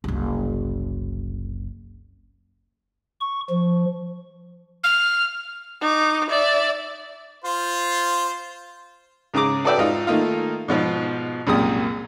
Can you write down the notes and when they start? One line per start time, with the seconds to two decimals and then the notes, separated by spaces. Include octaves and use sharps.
0.04 F#1 C2
3.21 C#6
3.50 F3
4.84 F6
5.81 D#4 D6
6.29 D5 E5
7.45 F4 C5
9.34 G#2 C#3 G#4 A#5 D6
9.64 F#4 A4 B4 D5 E5 G5
9.78 G#2 D#4 F4
10.07 D#3 A3 A#3 D#4 F4
10.68 G#2 B2 F3
11.47 C2 F#2 A#2 G#3 G4 D#6